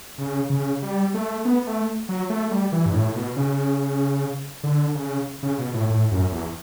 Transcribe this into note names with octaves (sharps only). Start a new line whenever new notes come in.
C#3
C#3
G3
A3
B3
A3
F#3
A3
G3
E3
G2
A2
B2
C#3
D3
C#3
C#3
B2
A2
A2
F#2
E2